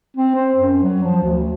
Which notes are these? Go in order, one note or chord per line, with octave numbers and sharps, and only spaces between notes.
C4
C5
F#2
F#3
F3
D2